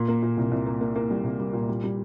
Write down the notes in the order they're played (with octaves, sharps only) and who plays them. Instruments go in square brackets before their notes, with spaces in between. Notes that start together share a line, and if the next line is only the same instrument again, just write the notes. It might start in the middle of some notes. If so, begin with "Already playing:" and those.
Already playing: [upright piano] A#2
A#3
A#2
C2
C2
A#3
A#3
A#3
G3
C2
G3
A#2
G3
G3